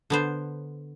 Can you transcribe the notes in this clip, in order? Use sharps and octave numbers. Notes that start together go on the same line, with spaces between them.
D3 B3 C5